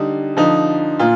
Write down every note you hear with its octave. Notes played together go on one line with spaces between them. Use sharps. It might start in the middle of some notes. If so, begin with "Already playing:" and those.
Already playing: D3 G3 D#4
D3 F3 D#4
A#2 F4